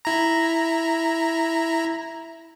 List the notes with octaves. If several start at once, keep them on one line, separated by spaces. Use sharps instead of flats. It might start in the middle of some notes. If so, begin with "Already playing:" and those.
E4 A#5